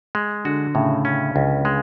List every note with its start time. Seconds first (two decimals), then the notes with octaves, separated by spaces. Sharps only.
0.15 G#3
0.45 D3 F#4
0.75 A2 C#3
1.05 C#4
1.36 C#2
1.65 G#3